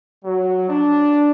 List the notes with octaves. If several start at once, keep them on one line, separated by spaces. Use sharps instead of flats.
F#3
D4